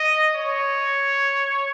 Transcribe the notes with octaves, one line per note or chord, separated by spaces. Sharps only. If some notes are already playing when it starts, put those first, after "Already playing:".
Already playing: D#5
C#5